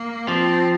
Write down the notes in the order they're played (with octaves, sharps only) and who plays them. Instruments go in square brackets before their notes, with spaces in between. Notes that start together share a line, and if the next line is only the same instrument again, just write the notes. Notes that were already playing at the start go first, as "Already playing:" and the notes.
Already playing: [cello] A#3
[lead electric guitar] F3 [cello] C4